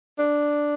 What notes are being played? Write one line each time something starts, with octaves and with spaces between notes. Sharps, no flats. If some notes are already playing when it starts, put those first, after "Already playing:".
D4